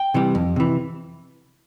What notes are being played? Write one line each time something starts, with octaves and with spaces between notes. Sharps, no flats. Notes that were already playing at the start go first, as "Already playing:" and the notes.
Already playing: G5
C3 E3 G3
F2
C3 E3